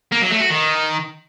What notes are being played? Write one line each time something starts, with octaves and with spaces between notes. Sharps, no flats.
A#3
F#3
A3
F#4
D#3